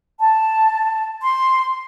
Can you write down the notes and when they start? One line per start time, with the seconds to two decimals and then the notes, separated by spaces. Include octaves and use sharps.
0.20 A5
1.22 C6